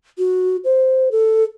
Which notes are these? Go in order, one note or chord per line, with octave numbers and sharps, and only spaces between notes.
F#4
C5
A4